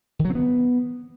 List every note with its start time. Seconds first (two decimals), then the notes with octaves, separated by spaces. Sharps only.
0.19 D#3
0.25 F#3
0.30 C4
0.35 B3